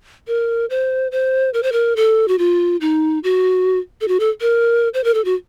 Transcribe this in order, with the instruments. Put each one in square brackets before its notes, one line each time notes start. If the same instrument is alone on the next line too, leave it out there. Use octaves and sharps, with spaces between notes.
[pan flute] A#4
C5
C5
A#4
C5
A#4
A4
F#4
F4
D#4
F#4
A4
F#4
A4
A#4
C5
A#4
A4
F#4